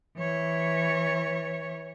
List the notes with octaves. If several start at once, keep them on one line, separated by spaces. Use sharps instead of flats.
E3 C#5